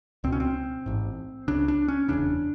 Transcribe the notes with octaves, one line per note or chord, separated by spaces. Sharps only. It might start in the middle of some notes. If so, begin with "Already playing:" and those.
C#2 B2 C4
C#4
C4
A1 G#2
C#2 C#3 D4
D4
C#4
F1 E2 C#3 D4